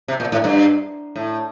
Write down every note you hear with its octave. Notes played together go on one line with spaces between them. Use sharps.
C3
A#2
A2
G2
A2